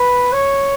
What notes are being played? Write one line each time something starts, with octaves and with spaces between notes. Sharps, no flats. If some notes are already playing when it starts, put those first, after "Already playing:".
Already playing: B4
C#5